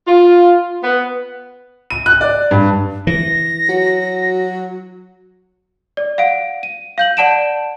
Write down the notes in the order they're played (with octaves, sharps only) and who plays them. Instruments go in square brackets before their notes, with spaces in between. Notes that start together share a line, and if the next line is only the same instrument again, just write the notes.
[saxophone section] F4
B3
[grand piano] D#7
F#6
D5
G2
[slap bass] E3 [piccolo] A#6
[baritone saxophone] F#3 [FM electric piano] F#4
[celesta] D5
F5 F#5 D7
D#7
F5 G6 F#7
D5 F#5 A5 D7 E7